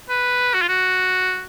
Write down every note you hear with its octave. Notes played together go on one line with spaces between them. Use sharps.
B4
F#4
F4
F#4